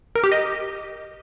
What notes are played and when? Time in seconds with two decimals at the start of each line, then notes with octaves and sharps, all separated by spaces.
0.15 A#4
0.24 G4
0.32 D#5